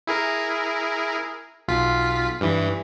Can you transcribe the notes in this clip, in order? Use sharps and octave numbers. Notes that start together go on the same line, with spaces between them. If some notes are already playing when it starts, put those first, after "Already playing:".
E4 G#4 A#4
B1 F4 B6
G2 E3